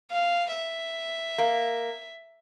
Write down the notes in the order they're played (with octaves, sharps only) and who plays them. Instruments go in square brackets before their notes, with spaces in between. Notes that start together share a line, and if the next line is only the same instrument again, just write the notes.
[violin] F5
E5
[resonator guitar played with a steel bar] A#3